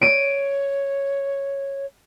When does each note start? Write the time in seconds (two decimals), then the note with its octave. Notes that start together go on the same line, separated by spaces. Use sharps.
0.01 C#5 D7 D#7